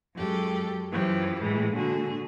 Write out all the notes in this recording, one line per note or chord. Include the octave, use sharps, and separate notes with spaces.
F#2 G#3 G4 A4
F#2 E3 F3 G4
A2 E3 G#3
A#2 D3 F#4 G#4